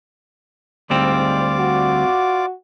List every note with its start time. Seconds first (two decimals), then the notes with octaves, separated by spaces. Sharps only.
0.90 D2 G#2 G3 C4 F4 D5 D6
1.59 F#4